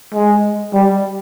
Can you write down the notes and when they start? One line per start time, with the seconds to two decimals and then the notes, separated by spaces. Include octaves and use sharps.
0.14 G#3
0.73 G3